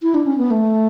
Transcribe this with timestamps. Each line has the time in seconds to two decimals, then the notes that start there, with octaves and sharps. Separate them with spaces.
0.02 E4
0.14 D4
0.26 C#4
0.38 B3
0.51 A3